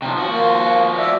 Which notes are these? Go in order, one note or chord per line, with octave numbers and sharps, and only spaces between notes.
C3 F3
F3 F#4
A#3 C5
D5 E5